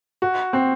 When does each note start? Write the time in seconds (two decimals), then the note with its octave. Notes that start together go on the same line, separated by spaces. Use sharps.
0.22 F#4
0.53 C4